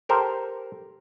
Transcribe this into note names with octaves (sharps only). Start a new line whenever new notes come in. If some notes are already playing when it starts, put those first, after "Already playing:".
G4 A4 A#4 C5